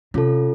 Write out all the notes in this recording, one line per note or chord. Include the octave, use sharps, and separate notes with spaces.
C3 C#4 F4 A4